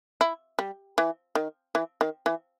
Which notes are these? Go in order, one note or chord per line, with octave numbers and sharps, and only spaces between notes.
E4
G3
E3
D#3
E3
D#3
E3